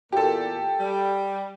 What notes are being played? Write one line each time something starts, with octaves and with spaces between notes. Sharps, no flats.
E2 A#2 G4 A4
G3